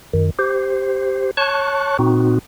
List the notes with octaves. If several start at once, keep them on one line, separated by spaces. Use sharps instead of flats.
F#2 D#3
G4 C5
C#5 A5 C#6 F#6
A#2 C4 D#4 F#4